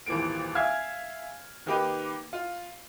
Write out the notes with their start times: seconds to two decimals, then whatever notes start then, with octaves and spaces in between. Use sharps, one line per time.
0.06 D#1 G#1 E3 F3 A#3 D7
0.55 E5 F5 G#5 F6 G#6
1.66 D#3 A#3 D#4 G4 B4
2.33 F4